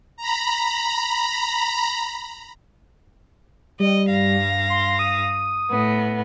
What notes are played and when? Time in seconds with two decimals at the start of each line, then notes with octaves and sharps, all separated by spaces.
0.17 A#5 B5
3.80 G3 D#5
4.09 G2 F5 A#6
4.70 C6
4.99 D#6
5.70 A2 B3